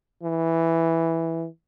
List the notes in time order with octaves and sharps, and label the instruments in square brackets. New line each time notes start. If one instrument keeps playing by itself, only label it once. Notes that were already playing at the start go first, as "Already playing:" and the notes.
[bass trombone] E3